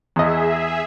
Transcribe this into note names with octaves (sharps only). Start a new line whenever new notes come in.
E2 G#4 D#5 E5